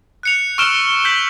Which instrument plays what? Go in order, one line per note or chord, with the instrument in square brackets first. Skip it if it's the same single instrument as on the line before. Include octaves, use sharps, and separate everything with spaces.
[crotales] F#6 C#7 F7
C#6 E6 F6 D7 E7 G7
G6 B6 F#7